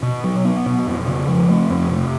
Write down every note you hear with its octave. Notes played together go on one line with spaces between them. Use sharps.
B2
F#3
B3
B2
F2
C#3
F3
A3
F2
C3